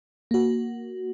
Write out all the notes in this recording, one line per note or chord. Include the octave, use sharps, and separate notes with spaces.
A#3 F#4